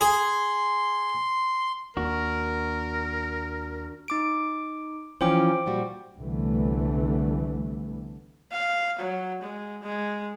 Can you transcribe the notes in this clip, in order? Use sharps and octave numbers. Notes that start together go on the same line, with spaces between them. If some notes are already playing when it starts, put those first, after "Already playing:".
G#4 C6
D#2 A#3 D4 F#4 A#4
D#4 D6 D7
E3 F3 C#4 C5 G5 D6
A#2 G3 F#4
C2 D3 E3 A3 B3
F5
F#3
G#3
G#3